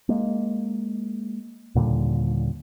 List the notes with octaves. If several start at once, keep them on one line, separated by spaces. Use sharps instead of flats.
G#3 A#3
D#2 A#2 D3 G3